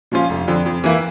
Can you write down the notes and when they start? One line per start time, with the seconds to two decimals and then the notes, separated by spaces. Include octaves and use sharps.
0.11 A#2 F3 C#4 F4
0.30 F1
0.48 F2 D3
0.66 F2
0.84 E3 A#3 E4